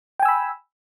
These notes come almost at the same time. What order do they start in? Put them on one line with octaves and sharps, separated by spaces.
G5 G#5 E6 B5